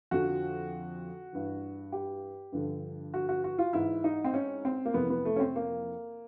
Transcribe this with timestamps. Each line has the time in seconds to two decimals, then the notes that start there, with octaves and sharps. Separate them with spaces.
0.11 F2 D3 F3 F#4
1.33 G2 E3
1.92 G4
2.52 G2 D3 F3
3.14 F#4
3.29 F#4
3.44 F#4
3.58 F4
3.73 G#2 E3 E4
4.04 D#4
4.24 C4
4.34 C#4
4.65 C4
4.85 A#3
4.94 F2 C3 E3 B3
5.10 B3
5.25 A3
5.36 C#4
5.40 C4
5.56 A#3